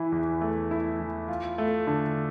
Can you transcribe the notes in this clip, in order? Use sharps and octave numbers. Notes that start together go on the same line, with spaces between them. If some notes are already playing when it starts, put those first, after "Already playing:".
Already playing: E3 E4
E2
A3
E4
E3
F4
A3
D3